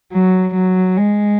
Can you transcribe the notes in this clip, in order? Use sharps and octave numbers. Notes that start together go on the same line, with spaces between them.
F#3
F#3
G#3